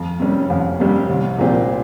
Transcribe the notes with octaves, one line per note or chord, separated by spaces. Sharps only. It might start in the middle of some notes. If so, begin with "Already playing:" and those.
Already playing: F2
C3 G3 C#4
F2
C3 G3 C#4
C2
A#2 F3 C4 G4